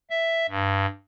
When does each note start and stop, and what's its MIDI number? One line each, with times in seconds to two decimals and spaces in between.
0.10 0.46 76
0.49 0.86 43